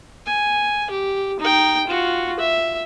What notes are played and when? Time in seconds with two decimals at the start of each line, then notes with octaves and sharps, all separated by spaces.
0.26 G#5
0.90 G4
1.40 D#4 G5
1.87 F4 F#4
2.39 E5